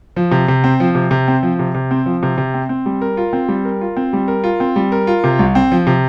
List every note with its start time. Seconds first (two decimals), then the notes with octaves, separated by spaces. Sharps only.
0.16 F3
0.31 C3
0.48 C3
0.64 C4
0.80 F3
0.95 C3
1.11 C3
1.28 C4
1.43 F3
1.59 C3
1.74 C3
1.91 C4
2.06 F3
2.23 C3
2.38 C3
2.54 C4
2.69 C4
2.86 G3
3.01 A#4
3.17 F4
3.33 C4
3.48 G3
3.65 A#4
3.81 F4
3.97 C4
4.13 G3
4.28 A#4
4.44 F4
4.60 C4
4.76 G3
4.92 A#4
5.07 F4
5.24 C3
5.39 C2
5.55 C4
5.72 F3
5.87 C3